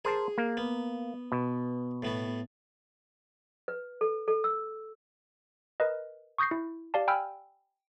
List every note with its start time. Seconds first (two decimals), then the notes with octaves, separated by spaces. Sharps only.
0.05 G#4 A#4 C5 A5
0.38 A#3
0.57 B3
1.32 B2
2.03 A2 B3 F#4
3.68 B4
4.01 A4
4.28 A4
4.44 E6
5.80 A#4 B4 D#5
6.38 C#6 D#6 G6 A#6 C7
6.51 E4
6.94 G4 D5 F5 A5
7.08 G5 G#5 B5 E6 F6